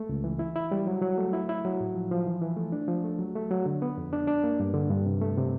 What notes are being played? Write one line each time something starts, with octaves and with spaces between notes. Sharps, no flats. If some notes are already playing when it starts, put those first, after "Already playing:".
Already playing: A3
C#2
E3
E4
E4
G3
F#3
F#3
A3
E4
E4
F#3
A2
F3
F3
E3
E3
A3
D4
F3
A3
F#3
A3
F#3
D3
B3
F2
D4
D4
A#3
G2
D3
G2
C3
A3
C3